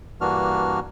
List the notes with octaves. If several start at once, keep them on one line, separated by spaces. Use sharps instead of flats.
G2 E3 A#3 D4 F#4 F6